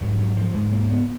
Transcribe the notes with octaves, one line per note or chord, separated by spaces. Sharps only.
G#2 F#3
F#3
F3
G#2 G#3
A#3
B3